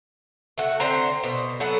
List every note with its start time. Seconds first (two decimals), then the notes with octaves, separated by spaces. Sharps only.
0.58 A3 F#4
0.80 D3 C4 C5 A#5
1.23 B2
1.60 F#3 B3 A4 F#5